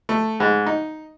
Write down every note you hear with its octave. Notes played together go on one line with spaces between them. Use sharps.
A3
G#2
D#4